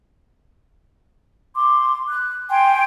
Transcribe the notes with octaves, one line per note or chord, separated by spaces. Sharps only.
C6 D6
F#6
G5 G#5 C6